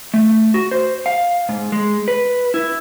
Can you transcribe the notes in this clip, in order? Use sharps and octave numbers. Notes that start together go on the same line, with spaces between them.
A3
F#4
C5
F5
G#2
G#3
B4
E4